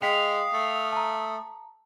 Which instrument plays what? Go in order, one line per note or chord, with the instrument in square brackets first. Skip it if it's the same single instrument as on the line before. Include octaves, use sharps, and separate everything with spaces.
[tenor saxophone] G#3 [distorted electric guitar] F5 [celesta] G5 B6 [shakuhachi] D#6
[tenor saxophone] A3
[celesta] A5 A#5